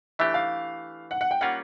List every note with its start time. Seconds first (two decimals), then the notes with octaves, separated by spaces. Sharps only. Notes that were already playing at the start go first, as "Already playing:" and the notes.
0.19 E3 A3 D4 G4 E5
0.34 F5
1.11 F#5
1.21 F#5
1.31 G5
1.41 G3 A#3 C#4 F4 A#4 F#5